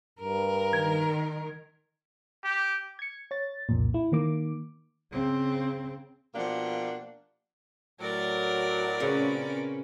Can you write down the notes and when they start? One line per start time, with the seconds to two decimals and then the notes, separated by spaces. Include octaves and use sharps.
0.21 G2 A#4
0.73 D#3 G#6
2.44 G4
2.99 G#6 C#7
3.31 C#5 A6
3.69 C2 F2 A#2
3.94 E4
4.12 D#3 A#3 D6
5.12 C#3 C4
6.35 B2 F3 A#3 D4 G4 F#5
8.00 A2 F#3 A#4 D5
9.00 A#2 C#3 C4 C#4 B4 F#5